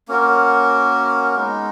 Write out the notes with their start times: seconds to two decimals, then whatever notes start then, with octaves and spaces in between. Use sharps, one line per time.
0.08 A#3 C#4 F#4 A#4
1.36 G#3 B3 D#4